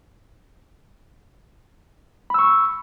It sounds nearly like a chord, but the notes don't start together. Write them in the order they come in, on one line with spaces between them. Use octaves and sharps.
B5 E6 C#6